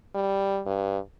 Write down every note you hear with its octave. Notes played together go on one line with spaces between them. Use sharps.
G3
G2